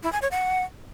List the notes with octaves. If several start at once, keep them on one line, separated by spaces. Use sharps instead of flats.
E4
G#5
C#5
F#5